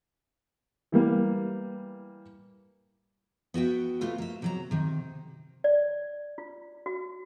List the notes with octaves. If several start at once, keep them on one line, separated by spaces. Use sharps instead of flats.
E3 G3 A#3
B3 F#4 E5 G5
C3 A3 F4 B4
A#3 E5
C3 F#3 A#5
C3 D#3
D5
F4
F#4